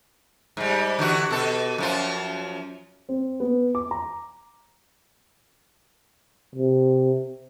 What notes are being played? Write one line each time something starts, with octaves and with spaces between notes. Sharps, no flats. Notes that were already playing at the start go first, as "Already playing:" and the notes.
G#2 G3
D3 E3 F#4
B2 A4
F#2 F3 F4
C4
B3
D6
A#5
C3